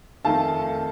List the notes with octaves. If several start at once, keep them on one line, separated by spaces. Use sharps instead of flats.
F2 D#3 A3 D#4 F5 A5